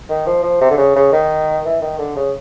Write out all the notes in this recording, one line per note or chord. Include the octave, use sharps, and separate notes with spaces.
D#3
F3
F3
C3
D3
C#3
C#3
D#3
E3
D#3
D3
C#3